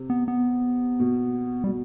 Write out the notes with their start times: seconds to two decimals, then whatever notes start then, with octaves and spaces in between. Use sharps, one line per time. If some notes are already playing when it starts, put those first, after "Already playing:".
Already playing: C3
0.10 B3
0.28 B3
1.00 B2
1.64 G3
1.67 B2